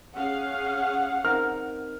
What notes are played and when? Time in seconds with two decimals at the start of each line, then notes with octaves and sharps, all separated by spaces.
0.14 C#4 G#4 F5 F#5
1.25 C4 D#4 A#4 F6